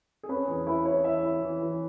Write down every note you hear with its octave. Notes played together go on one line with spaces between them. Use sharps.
G#4
C#4 B4
E2 G#4
E4 B4
E4 C#5
E3 E5
E4
E3
E3